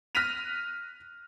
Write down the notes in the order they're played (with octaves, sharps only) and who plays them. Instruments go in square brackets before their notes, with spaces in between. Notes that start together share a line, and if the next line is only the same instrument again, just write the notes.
[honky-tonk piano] F6 F#6 A#6 B6 D#7 F7